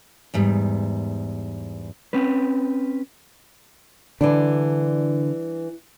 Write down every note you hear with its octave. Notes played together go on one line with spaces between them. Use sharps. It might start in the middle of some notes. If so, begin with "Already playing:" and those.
E2 G#2 G3
C4 C#4 B4
D3 E3 G3 D4